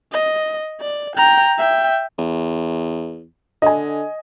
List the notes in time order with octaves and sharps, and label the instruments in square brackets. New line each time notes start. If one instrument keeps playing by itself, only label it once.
[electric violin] D#5
D5
G5 A#5
E5 G5
[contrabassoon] E2
[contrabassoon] D3 [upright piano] D#5 G#5